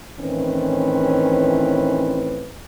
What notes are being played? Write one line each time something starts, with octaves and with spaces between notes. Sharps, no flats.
A2 D#3 E3 C4 C#4 B4